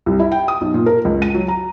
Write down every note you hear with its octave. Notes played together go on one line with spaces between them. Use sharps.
C2
E4
G5
D#6
B1
A#2
A#4
C#2
D#7
F#3
A#5